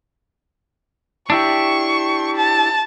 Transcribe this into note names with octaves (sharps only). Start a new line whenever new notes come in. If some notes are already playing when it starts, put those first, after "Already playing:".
D4 E4 G4 C#6
A5